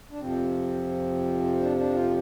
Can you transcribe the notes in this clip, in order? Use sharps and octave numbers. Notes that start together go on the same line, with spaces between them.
D4
F2 C3 F3 C4
D4
D4
F4